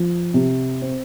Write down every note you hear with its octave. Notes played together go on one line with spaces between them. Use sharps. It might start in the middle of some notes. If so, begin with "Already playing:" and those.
Already playing: F3
C3
C4